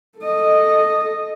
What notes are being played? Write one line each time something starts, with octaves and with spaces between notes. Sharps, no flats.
A4 D#5